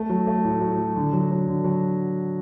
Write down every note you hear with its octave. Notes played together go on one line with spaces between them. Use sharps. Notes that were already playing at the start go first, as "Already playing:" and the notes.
Already playing: A3
F#3
A3
A2
F#3
F#3
D3
F#3
F#3
D3
F#3